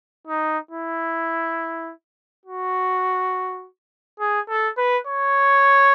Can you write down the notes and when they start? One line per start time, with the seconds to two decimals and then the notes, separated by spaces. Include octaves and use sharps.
0.27 D#4
0.71 E4
2.45 F#4
4.20 G#4
4.49 A4
4.77 B4
5.07 C#5